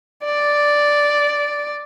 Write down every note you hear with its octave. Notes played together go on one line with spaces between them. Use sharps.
D5